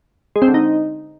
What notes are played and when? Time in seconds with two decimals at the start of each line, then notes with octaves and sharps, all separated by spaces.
0.36 G#3
0.42 C4
0.48 D3
0.54 D#4